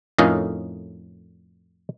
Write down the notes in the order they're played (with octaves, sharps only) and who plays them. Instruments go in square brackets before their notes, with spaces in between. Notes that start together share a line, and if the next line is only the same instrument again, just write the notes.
[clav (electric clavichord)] F2 A2 C#4 D#4 A#4 F5